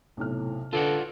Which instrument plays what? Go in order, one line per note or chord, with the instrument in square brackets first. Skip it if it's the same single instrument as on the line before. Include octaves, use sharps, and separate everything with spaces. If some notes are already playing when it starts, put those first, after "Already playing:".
[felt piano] B1 C3 F6 [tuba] A2
[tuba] D3 [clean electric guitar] F4 D5 F#5 [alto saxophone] A4 [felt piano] B4